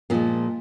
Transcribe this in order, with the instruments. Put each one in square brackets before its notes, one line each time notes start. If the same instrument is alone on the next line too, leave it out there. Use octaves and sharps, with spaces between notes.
[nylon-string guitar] A#2 F3 G#3 A#3